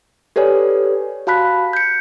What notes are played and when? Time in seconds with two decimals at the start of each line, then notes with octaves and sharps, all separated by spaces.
0.36 G4 A4 B4 C#5 D5 G#5
1.27 F#4 F5 A5 B5 F#6 B6
1.73 G6 C#7